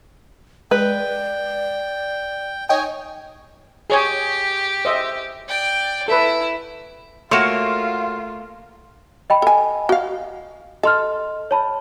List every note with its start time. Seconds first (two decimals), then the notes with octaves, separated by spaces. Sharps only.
0.71 G#3 B4 D5 G5
2.69 D#4 C#5 D#5 G5 G#5
3.90 G4 G#4 C#5 G#5
4.85 C5 D#5 E5
5.48 D5 G5
6.08 E4 A4 B4 E5
7.31 A3 A#3 F4 F#4 C#5 C6 E7
9.30 D#5 G5 B5
9.42 A4 G#5
9.89 F#4 F5
10.83 A4 D#5 C6 F6
11.51 C#5 A5 B5